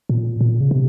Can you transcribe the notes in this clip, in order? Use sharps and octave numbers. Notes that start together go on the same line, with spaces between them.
A#2
A#2
C#3
C3